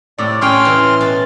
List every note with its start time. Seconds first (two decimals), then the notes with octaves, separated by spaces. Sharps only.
0.18 A2 C3 D5
0.41 A2 C#4 G5 C6 F6
0.65 E3
1.01 B2 A5